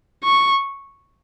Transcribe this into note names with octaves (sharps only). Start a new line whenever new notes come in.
C#6